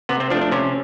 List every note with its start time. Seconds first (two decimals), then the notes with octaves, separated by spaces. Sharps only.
0.09 C3 B3
0.20 C4
0.30 F3 D4
0.34 A3
0.41 D4
0.52 C3 C#4